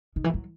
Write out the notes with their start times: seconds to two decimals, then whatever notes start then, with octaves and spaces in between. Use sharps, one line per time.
0.16 D#3
0.24 E3
0.34 F#3